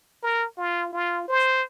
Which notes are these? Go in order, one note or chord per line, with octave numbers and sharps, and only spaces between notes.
A#4
F4
F4
C5